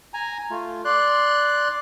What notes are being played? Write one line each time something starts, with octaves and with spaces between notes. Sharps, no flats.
G#5 A#5
A3 F4
D5 C6 F#6